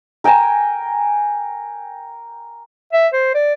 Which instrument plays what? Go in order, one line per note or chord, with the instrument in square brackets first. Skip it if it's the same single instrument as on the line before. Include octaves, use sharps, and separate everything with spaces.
[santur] A#4 G5 G#5 A#5
[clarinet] E5
C5
D5